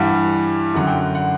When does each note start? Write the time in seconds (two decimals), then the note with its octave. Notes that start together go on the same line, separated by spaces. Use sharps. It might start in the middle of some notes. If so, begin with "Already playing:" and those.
Already playing: G2 E3 G3 F#5
0.74 F#2 D3 F#3 F#5
0.87 G5
1.15 F#5